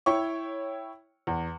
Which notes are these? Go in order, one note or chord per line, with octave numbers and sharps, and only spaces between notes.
E4 C#5 G5 C#6
E2